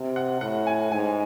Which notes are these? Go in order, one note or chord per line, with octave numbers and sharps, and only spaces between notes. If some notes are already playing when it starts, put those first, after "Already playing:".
Already playing: C3
F#5
A2 F#5
G#5
G#2 G#5